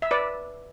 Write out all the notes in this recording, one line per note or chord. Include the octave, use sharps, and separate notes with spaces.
E5
B4 D5